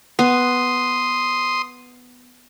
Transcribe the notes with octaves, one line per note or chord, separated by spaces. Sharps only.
B3 C6 D#6